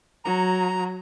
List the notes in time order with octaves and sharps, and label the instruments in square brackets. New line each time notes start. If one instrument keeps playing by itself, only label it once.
[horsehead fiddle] F#3 [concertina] A#5